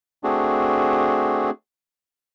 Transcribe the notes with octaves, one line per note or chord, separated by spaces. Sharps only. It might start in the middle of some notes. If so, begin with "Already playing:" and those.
A3 C4 D4 F#4 G#4